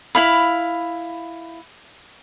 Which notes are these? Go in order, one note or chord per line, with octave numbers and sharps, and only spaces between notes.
E4 F5 B5